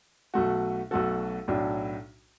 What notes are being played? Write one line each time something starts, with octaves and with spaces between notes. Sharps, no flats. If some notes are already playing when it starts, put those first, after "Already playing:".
B1 B2 A3 F#4
B1 B2 A3 F#4 A4
B1 A2 F#3 D4